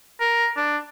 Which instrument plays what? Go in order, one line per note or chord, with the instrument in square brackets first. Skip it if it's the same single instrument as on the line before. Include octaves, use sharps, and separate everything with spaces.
[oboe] A#4
D4